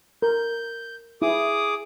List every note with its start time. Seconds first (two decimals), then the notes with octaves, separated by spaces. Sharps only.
0.22 A#4 G6
1.22 E4 G#4 D6 D#6